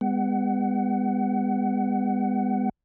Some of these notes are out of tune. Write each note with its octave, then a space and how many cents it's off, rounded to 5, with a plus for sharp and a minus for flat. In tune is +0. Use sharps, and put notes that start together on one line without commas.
G#3 -40 B3 +15 F#5 +25